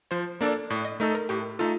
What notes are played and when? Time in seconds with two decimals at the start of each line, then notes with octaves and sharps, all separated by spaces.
0.11 F3 C5
0.41 A#3 D4 A4 D5
0.70 A2 D5
0.85 D#5
1.00 A3 D#4 A4 A#4
1.15 A#4
1.29 A2 G4
1.59 A3 D#4 F4 A4